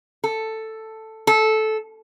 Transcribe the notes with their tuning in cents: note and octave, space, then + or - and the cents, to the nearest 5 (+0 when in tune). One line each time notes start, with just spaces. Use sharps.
A4 +5
A4 -15